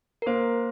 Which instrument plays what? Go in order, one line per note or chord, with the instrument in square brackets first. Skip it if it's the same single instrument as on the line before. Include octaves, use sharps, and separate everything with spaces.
[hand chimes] A#4
[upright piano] A#3 [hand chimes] C5